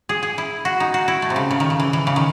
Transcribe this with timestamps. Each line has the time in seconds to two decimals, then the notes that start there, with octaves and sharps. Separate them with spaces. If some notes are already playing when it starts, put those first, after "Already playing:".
0.09 G#4
0.23 G#4
0.38 E4
0.65 F#4
0.80 D#4
0.94 F#4
1.08 E4
1.22 A3
1.30 C3
1.36 C#3
1.51 C#3
1.60 D#3
1.70 C#3
1.80 E3
1.93 E3
2.07 C#3
2.16 D#3